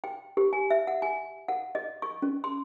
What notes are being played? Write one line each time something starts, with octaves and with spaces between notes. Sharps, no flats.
G5
G4
G#5
E5
F#5
G#5
F#5
D#5
C#6
C#4
C6